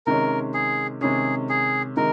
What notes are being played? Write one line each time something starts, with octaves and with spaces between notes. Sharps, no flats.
C3 D#3 G#3 C#4 A#4
G#4
C3 D#3 G#3 C#4 G#4
G#4
C3 D#3 G#3 A#4